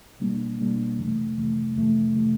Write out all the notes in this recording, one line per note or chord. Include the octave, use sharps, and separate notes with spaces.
B2 G3 A#3 D4
B2 G3 A#3 D4
F2 C3 E3 A3
F2 C3 E3 A3
F2 C3 E3 A3
C3 E3 A3